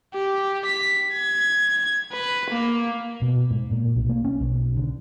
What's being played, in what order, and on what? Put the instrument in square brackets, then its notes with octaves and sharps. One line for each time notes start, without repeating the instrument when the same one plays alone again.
[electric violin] G4
B6
G#6
B4
A#3
[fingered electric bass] B2
G#2
A#2
B1
A#3
C#4
B1
D3